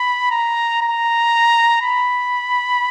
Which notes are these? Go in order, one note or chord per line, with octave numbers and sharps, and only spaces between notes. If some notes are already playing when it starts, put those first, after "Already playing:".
Already playing: B5
A#5
A#5
B5